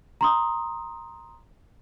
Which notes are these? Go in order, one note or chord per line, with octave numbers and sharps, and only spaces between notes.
A#5 C6 D#6